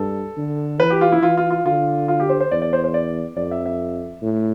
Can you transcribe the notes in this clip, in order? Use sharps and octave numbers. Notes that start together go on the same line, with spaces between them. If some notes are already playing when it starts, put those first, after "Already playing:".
Already playing: G2 A4
D3
E3 B4
G4
F4
E4
E3 F4
F4
F4
D3 F4
F4
G4
C5
C5
E2 D5
D5
C5
C5
D5
F2 D5
E5
E5
A2